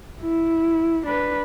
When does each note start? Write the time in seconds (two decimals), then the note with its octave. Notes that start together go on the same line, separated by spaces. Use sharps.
0.22 E4
1.06 D4 B4